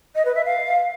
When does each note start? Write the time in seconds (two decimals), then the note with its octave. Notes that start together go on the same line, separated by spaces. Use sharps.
0.15 D#5
0.25 B4
0.35 E5
0.45 F5